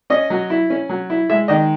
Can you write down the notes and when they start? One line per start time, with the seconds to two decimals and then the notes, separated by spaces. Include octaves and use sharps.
0.10 C#4 D#5
0.30 F#3
0.50 E4
0.70 C#4
0.89 F#3
1.10 E4
1.30 G#3 E5
1.48 D#3 D#5